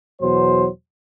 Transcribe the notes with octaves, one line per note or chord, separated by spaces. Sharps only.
E2 B2 F#3 C5